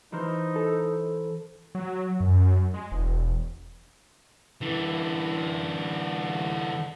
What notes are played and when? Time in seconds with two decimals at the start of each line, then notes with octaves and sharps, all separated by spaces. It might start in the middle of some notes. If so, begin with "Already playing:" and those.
0.12 E3 D#4 A#4 C5
0.56 A4
1.75 F#3
2.20 F#2
2.74 G#3
2.92 E1
4.61 D3 E3